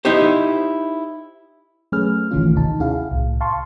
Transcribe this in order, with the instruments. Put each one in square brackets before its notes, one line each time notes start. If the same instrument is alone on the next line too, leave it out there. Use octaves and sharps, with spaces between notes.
[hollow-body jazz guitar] D#4 E4 G4 C5
[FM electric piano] F#3 A3 C#4 G#4 B4 F6
A1 D#3 E3 A3 C#4 F4
D#2 C3 D#4 A5
C#4 E4 F#4 G#4 F5
C2 A2
F5 A5 C6 C#6